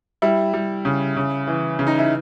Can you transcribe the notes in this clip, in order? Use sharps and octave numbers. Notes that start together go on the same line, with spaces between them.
G3 E4
G3
C#3
C#3
E3
C#3
D#4
E4